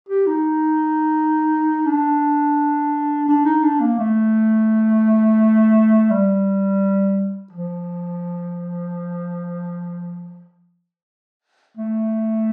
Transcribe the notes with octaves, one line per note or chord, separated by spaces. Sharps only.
G4
D#4
D4
D4
D#4
D4
A#3
A3
G3
F3
A3